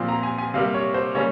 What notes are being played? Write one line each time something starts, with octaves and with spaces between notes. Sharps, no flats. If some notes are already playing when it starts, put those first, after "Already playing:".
Already playing: A#2 F3 C4 C6
A#5
G#5
G#5
C3 G3 A#3 F5
C#5
C5
C#3 G3 A#3 C#4 C#5